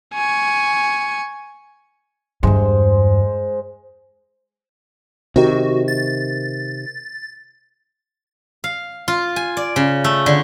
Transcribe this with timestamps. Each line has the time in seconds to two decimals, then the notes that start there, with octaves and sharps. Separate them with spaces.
0.14 G#5 C#6
2.43 E2 G2 G#3 C5
5.36 C3 D#3 F#4
5.88 A6
8.64 F5
9.08 F4
9.36 G#5
9.57 D5
9.76 C#3
10.04 A3
10.26 D3